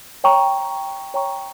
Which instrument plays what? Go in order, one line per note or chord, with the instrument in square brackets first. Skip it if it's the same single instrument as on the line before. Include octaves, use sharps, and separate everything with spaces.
[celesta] C#5 G5 A#5 C#6
C#5 G5 A#5 C#6